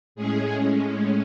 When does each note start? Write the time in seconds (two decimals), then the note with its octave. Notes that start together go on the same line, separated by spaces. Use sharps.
0.15 A2 G#3 C#4 G#4